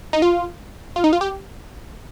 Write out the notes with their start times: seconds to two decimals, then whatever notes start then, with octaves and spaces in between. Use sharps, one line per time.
0.13 D#4
0.22 F4
0.96 F4
1.04 D#4
1.13 F4
1.21 G4